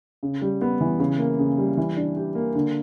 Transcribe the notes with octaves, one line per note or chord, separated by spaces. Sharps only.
C#3
G3
B3
E3
C#3
A#3
C#3
G3
E3
D4
G4
A#3
D3